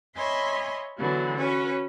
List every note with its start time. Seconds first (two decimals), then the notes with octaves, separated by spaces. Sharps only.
0.16 C#5 D#5 E5 G#5 B5 C6
0.99 D3 E3 F#3 B3
1.36 C#4 F#4 B4 C#5